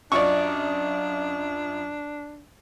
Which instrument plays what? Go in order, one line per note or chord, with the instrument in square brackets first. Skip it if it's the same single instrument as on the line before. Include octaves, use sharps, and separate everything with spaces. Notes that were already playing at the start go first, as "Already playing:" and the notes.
[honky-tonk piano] F#2 F4 D#5 [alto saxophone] D4 [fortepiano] D5 C#6